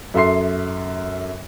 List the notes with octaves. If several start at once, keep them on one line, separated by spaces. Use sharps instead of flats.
F#2 A4 E5 C6 C7